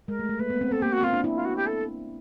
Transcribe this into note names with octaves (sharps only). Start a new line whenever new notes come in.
G#3 A#4
A3
A3
A#3 B4
B3
C4
C4 A4
A#3 G4
F#4
C4 F4
D4
E4
F4
F#4
G4
A4